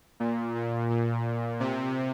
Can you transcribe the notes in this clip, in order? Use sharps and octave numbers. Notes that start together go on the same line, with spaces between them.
A#2
A#2
A#2
C3